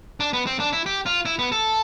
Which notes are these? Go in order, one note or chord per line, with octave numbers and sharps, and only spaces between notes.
D4
B3
C4
D4
E4
G4
F4
E4
B3
A4